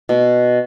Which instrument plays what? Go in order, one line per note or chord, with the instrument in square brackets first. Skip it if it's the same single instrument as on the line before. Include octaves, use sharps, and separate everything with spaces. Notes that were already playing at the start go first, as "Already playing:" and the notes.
[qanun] B2